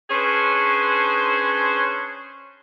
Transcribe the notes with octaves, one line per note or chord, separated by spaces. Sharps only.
C#4 D4 G#4 B4 C5